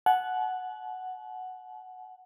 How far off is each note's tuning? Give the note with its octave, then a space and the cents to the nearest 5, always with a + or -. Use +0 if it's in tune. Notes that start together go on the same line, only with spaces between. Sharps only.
F#5 +0 A5 -45